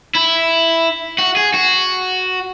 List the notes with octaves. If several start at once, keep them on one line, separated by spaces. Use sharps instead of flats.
E4
F#4
G#4
F#4